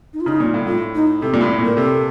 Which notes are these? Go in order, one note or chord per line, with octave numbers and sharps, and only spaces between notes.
D#4
F4
C#3 D#4
A#2
A2
A2 F4
D#4
C3 A4
A#2
A2
A#2
A#4
C3 A4